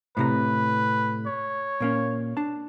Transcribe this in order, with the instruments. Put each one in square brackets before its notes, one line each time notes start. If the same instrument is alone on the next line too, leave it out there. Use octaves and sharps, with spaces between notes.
[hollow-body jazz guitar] A2 C3 A#5 [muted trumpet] B4
[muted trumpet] C#5
[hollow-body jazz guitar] A#2 A#3 C#4
D4 A5